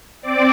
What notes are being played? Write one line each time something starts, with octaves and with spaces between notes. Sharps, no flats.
C4 D5 D6